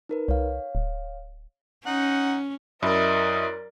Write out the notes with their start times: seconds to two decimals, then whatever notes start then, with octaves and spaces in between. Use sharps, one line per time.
0.09 D#4 A#4 B4
0.28 C2 C#5 F5
0.75 D1
1.86 C#4 D#4 F#5
2.83 F#2 E4 A#4 D5 D#5